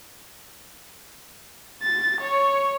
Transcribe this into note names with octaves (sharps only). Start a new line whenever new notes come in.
A6
C#5